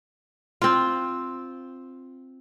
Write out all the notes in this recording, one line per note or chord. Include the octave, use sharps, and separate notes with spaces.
C4 F4